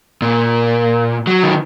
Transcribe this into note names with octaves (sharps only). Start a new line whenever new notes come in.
A#2
F#3
D#3